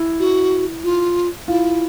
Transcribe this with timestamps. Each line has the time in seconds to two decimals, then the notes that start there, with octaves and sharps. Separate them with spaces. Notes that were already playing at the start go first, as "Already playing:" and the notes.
Already playing: E4
0.20 F#4
0.84 F4
1.48 E4 F4